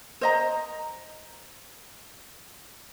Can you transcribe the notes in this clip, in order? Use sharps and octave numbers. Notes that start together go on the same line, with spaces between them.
C5 D#5 A#5